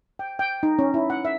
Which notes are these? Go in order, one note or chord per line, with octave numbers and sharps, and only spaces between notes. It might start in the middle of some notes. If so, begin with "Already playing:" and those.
G5
G5
D#4
C#4
E4
F#5
E5